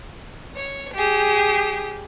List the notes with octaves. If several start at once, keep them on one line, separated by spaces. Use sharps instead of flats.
C#5
G4 G#4